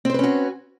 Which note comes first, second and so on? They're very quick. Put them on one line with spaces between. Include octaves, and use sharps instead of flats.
C4 C5 B4 C#4 F#4